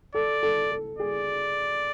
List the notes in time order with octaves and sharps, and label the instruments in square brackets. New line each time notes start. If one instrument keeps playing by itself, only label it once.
[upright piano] A4 [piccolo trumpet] D5
[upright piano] A4
A4
[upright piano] G#4 [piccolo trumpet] D5